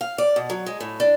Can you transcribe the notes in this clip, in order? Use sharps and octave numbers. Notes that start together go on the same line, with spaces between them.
F5
D5
B2
F#3
G#3
A2
D4